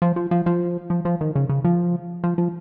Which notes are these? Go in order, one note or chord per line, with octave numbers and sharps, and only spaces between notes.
F3
F3
F3
F3
F3
F3
D#3
C#3
C#3
F3
F3
F3